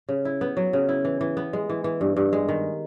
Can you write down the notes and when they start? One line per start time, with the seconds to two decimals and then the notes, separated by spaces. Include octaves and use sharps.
0.09 C#3
0.25 E4
0.41 B3
0.57 F#3
0.73 C#3
0.89 E4
1.05 E3
1.21 E3
1.37 B3
1.53 G#3
1.70 E3
1.84 E3
2.01 G2
2.17 G2
2.33 G#3
2.49 D#3